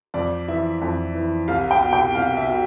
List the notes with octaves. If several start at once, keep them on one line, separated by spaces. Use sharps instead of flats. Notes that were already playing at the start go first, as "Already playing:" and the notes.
F2 D5
E3 E5
F2
E3
C2 F5
G5
B2
G5
C2 F5
E5
B2